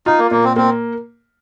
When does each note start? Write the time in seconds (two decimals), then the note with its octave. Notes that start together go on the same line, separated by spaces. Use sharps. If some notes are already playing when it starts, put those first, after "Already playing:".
0.06 D#4 F4
0.19 A#3
0.31 A#2 A#3
0.44 C4
0.56 A#3 C4